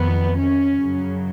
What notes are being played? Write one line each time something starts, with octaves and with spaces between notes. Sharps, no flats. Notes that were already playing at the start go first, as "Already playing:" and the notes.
Already playing: F2 D#3 F#3 B3
C#4
F#2 C#3 F#3